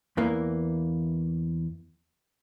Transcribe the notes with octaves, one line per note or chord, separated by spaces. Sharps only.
E2 E3 A#3